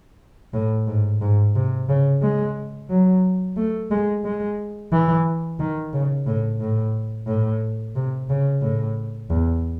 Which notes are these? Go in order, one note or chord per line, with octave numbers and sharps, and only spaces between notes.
A2
G#2
G#2
C3
C#3
G#3
F#3
A3
G#3
G#3
E3
D#3
C#3
A2
A2
A2
C3
C#3
A2
E2